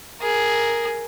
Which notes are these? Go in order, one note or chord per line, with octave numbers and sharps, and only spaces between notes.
G#4 A#4